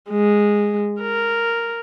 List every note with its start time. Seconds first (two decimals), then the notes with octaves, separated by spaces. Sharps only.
0.10 G#3
1.01 A#4